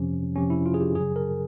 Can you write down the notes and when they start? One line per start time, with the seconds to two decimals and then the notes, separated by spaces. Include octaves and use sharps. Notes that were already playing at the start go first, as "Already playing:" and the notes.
Already playing: F2 C3 F3 C#4
0.36 F2 C3 F3 C#4
0.50 E4
0.66 F4
0.74 G#4
0.81 G4
0.95 F#2 C#3 F#3 G#4
1.16 A#4